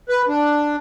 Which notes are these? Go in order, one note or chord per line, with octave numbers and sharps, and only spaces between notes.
B4
D4